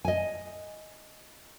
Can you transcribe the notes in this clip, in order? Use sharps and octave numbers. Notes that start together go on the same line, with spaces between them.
D#5 G#5